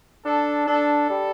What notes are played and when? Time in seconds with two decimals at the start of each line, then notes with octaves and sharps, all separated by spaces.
0.25 D4 A4
0.67 D4 A4
1.10 G3